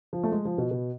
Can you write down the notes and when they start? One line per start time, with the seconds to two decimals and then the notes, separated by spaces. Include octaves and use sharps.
0.13 F3
0.23 A3
0.32 G#3
0.45 F3
0.58 B2
0.71 B2